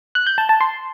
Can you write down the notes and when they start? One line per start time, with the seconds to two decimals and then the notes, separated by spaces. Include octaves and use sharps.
0.15 F#6
0.27 G6
0.38 A5
0.49 A5
0.61 C6